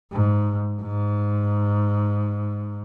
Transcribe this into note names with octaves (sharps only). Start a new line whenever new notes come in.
G#2
G#2